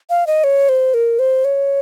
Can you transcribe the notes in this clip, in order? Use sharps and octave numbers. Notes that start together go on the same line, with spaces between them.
F5
D#5
C#5
C5
A#4
C5
C#5